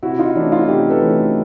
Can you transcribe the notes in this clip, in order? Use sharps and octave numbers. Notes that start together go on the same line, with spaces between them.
C3 E4 F#4
D#4 F4
E3 A3 C#4 D4 E4
D#4 F4
C3 F4 G4
A4 B4
E3 A3 C#4